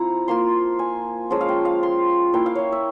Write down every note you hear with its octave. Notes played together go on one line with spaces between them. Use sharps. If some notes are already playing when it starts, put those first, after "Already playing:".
Already playing: F3 C4 E4 A#5 C6
A#3 F4 C6
G#5
F3 G#3 C#4
F5
G5
F5
C6
A#3 E4 G5
F5
C#5 E5
E5